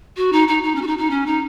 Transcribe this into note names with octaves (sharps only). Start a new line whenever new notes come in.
F#4
D#4
D#4
D#4
C#4
F#4
D#4
D#4
C#4
D#4